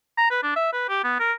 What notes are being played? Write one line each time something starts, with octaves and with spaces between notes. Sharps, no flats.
A#5
B4
D4
E5
B4
G4
B3
A#4